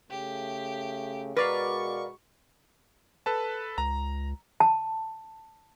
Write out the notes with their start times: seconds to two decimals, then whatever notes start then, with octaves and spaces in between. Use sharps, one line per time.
0.10 C#3 A3 G4
1.37 B2 G#3 F#4 A#4 B4 D5 F5 C#6
3.26 A4 B4 A5
3.78 C#2 A#5
4.60 A5